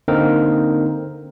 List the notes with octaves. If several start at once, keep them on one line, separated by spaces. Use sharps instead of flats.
D3 A#3 C4 D#4 A#4